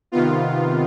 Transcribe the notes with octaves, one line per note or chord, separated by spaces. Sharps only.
C3 D#3 B3 F4